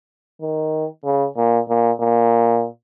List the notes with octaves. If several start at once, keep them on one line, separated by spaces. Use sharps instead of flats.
D#3
C#3
A#2
A#2
A#2